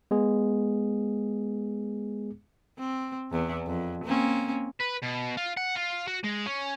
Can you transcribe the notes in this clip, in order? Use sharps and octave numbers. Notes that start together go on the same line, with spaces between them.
G#3 B3 G#4
C4
E2
F2
A#3 C4 C#4
B4
B2
F4
F#5
F4
F#4
G#3
C#4